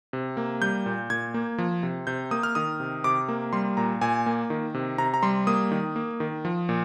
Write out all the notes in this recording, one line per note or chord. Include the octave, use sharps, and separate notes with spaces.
C3
A#3
G3 G6
A#2
A#2 G#6
A#3
F3
C3
C3 G6
A#3 D#6
F6
D#3 D#6
C3
C3 D6
A#3
G3 C6
A#2 A#5
A#2 G#5
A#3
D#3
C3
C3 A#5
A#5
G3 C6
A#3 D#6
D#3
A#3
D#3
F3
A#2